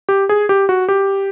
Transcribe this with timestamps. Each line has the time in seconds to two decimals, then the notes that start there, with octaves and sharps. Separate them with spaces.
0.09 G4
0.29 G#4
0.49 G4
0.69 F#4
0.89 G4